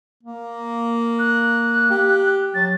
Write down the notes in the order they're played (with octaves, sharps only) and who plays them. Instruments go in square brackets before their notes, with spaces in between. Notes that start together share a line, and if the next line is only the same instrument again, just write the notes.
[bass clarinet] A#3
[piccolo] F#6
[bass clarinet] G4
[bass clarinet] F#3 [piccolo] A6